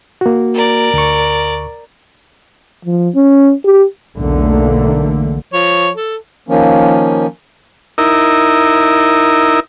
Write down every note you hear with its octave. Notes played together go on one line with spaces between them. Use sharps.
A#3 F#4
A#4 D5
D2 C#6
F3
C#4
G4
B1 E2 D3 A3 A#3
F3 C#5
A4
D#3 F3 A#3 C#4
D#4 E4 A#4